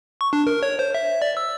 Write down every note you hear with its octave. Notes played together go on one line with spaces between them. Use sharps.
C#6
D4
A#4
C#5
C5
E5
D5
E6